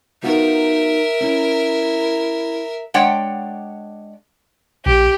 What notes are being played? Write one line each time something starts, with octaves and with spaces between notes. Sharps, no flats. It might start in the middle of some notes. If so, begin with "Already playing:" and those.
B3 D#4 F4 F#4 A#4 E5
C#4 E4
G#3 D4 C#5 D5 F#5 G5
A#1 G4